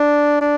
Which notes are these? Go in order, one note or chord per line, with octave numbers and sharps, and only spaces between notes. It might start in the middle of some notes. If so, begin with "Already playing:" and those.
Already playing: D4
D4